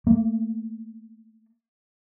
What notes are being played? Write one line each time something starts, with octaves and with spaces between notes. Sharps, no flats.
A3 A#3